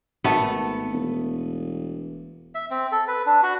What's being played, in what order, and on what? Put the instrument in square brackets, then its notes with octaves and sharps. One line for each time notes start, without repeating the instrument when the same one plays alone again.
[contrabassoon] G#1 [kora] A3 B3
[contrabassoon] E1
[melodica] E5
C4
A4
B4
D4
F#4